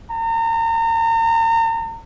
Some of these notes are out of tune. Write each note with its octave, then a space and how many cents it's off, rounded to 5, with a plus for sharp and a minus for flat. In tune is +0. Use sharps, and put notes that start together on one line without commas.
A#5 -35